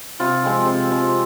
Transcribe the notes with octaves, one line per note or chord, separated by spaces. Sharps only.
C3 F4
F3 G#3 C4
C3
F3 G#3 C4